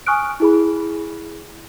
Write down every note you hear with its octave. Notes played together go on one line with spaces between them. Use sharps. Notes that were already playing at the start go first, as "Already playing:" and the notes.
G#5 C#6 D#6 F6 F#6 D7
E4 G#4 B5